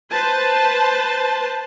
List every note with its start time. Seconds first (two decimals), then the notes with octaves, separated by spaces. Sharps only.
0.11 B4 C5 A5